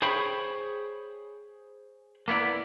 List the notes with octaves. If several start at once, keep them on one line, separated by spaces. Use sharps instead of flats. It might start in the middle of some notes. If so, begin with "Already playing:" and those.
G#4 C5 C#5 G5 B5
A#3 B3 E4 D5